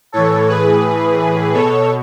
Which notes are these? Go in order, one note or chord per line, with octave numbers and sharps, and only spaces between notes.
A2 E3 A4 C#5
G#4 B4
B2 A4 C#5